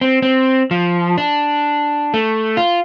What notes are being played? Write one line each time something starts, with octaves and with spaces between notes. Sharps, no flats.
C4
C4
F3
D4
A3
F4